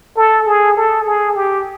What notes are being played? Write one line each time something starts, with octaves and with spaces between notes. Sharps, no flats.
A4
G#4
A4
G#4
G4